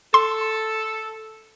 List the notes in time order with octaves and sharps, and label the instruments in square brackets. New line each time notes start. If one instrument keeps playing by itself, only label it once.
[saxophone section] A4 [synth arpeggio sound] C6